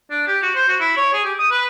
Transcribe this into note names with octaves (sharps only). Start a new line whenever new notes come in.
D4
G4
F#4
C5
F#4
E4
C#5
G#4
G4
D#6
B4